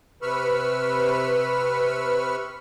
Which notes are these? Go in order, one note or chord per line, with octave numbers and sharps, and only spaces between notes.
C3 B4 B5 C#6 E6 F6